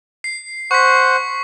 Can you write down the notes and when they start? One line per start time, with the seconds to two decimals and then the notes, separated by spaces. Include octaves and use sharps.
0.24 C7
0.71 C5 F#5 C#6 B6